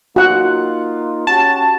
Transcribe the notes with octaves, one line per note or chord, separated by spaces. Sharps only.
A#3 D#4 F4 F#4 F#5
C#4 F#4 G4 A5